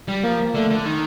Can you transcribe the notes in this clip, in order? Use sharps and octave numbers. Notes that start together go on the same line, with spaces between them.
G3
F3 A#3
D3 A3
D3
D#3